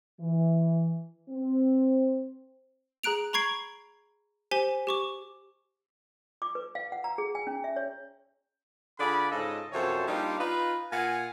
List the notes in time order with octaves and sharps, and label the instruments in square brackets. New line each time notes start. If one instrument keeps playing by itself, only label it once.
[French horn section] E3
C4
[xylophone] G#4 A#5 F#6 D7 F7
A#5 B5 C#6 G#6 C7 D7
G4 C5 G#5 B6 G7
G4 C#6 D6
[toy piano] D6
B4
F5
F#5
A#5
G#4
G#5
C#4
E5
C#5
[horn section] D3 F4 G#4 D5 B5
G#2 C#3 F4 A4 D#5
F#2 C3 F3 A4 C5 C#5
G3 A#3 D4 D#4 F4 G4
D#4 F4 B4
A#2 F4 F5 F#5 G#5